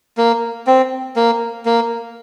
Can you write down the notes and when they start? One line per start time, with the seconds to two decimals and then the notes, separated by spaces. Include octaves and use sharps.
0.17 A#3
0.67 C4
1.16 A#3
1.66 A#3